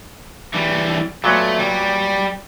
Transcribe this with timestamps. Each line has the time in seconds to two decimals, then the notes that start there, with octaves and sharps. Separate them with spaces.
0.54 E3 G3
1.24 A#2 F#3 A3 B3
1.59 G3